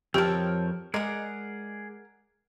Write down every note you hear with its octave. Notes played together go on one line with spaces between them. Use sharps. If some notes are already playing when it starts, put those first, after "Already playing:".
F2 F3 G4 A4 A#4 C#5 G5
G#3 G#4 A#4 D5 F#5